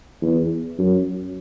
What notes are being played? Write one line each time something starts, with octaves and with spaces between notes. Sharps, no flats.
E2
F#2